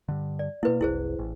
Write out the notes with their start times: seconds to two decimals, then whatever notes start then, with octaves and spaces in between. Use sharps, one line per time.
0.08 G2 D3
0.39 D5
0.63 B2 A#3 E4 B4
0.81 F#1 C2 E4 G#4 C5
1.19 A1